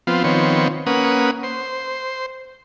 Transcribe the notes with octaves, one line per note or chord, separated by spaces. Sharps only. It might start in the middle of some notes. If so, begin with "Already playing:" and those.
F3 B3 C4 F4
D#3 F3 B3 C4 C#5
A#3 C#4 B4 F#5 D#6
C5